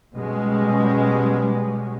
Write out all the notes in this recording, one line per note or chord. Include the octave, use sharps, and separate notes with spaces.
B2 G3 G#3 C#4